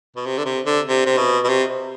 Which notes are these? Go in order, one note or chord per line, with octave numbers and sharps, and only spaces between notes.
B2
C3
D3
C3
D3
C3
C3
B2
B2
C3